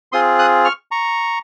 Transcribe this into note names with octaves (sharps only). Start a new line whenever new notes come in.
C4 F4 G#4 C6 D#6
D#6 F#6
C#6 F6
A#5 C#6